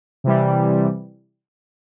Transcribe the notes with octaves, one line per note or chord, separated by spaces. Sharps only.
C3 E3 G3